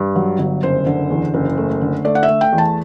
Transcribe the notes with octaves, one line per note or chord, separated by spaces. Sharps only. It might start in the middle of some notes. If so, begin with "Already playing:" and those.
Already playing: G2
F#3
G1
F#1 C5
D3
E2
F#1
A3
D3
A3 D5
F#5
E5
A3
G5
E2
A5